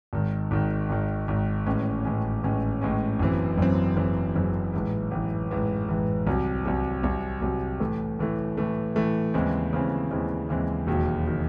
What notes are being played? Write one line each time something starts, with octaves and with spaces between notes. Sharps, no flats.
G#1 G#2 D#3
G#1 G#2 D#3
G#1 G#2 D#3
G#1 G#2 D#3
A1 A2 G#3 C#4
A1 A2 G#3 C#4
A1 A2 G#3 C#4
A1 A2 G#3 C#4
F#1 F#2 E3 C4
F#1 F#2 E3 C4
F#1 F#2 E3 C4
F#1 F#2 E3 C4
A1 G#2 E3
A1 G#2 E3
A1 G#2 E3
A1 G#2 E3
C2 C3 F#3
C2 C3 F#3
C2 C3 F#3
C2 C3 F#3
A2 E3 A3
A2 E3 A3
A2 E3 A3
A2 E3 A3
D#2 C#3 E3 G#3 C4
D#2 C#3 E3 G#3 C4
D#2 C#3 E3 G#3 C4
D#2 C#3 E3 G#3 C4
E1 D#2 D#3 F#3
D#3 F#3